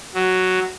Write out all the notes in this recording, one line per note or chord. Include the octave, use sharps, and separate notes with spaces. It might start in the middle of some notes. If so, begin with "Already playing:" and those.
F#3